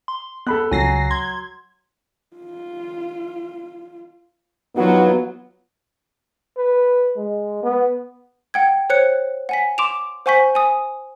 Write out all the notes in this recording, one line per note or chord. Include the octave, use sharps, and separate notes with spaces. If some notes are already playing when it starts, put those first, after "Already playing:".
C6
B3 A4 B5 F#6
C#2 F#3 G#5 A#6 C7
C6 G#6
F4
G2 F#3 B3 D#4 F4 F#4
B4
G#3
B3
F#5 G5 G#6
C5 C#5 F#6 C#7
F#5 G#5 B6
C6 D6 D7 E7 F7
C5 F#5 G#5 C#6 G6 B6
G#5 D#6